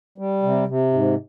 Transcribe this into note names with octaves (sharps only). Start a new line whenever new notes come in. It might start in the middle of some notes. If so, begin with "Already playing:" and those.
G3
C3
C3
G#2